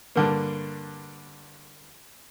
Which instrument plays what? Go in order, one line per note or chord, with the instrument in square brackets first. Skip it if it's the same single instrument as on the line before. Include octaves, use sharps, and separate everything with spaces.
[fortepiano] G2 D3 A#3